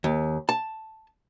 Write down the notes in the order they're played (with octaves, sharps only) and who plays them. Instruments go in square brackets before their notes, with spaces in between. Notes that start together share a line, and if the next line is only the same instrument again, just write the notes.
[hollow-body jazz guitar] D#2
A5